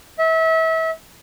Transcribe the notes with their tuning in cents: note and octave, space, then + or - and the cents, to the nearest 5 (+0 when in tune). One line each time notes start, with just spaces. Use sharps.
E5 -30